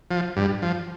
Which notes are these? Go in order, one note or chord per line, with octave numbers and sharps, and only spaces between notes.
F3
G2
F3